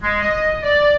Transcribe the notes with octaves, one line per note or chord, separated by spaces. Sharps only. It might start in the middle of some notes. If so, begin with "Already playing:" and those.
G#3
D#5
D5